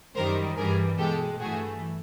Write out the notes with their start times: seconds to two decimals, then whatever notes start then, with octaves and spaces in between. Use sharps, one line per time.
0.15 F#2 D#3 G3 A#4 C5
0.56 G2 E3 G3 G#4 A#4
0.98 B2 G#3 G4 A4
1.39 G2 E3 A3 F#4 G#4